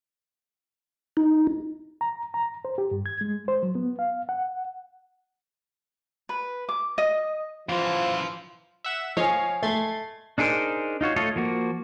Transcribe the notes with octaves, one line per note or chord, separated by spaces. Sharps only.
D#4
A#5
A#5
C5
G4
G2
G#6
G#3
C5
F#3
B3
F5
F#5
B4
D6
D#5
F#2 E3 F3 F4 C5 F5
E5 F#5 E7
F3 C#5 D#5 F5 G#5
A3 C6 G#6 A6
D4 D#4 G#4 A#4 C5
D#4 F4 F#4 C#5
A3 F4 A4 C#5 D#5
F3 A#3 F#4